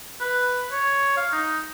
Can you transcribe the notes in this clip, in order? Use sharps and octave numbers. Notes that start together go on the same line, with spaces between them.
B4
C#5
F5
D#4